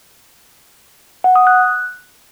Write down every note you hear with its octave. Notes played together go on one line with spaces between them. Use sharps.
F#5
D#6
F#6